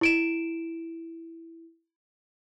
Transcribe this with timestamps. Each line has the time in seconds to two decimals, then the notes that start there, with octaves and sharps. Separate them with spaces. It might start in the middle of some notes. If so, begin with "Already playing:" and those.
0.01 E4 D7 E7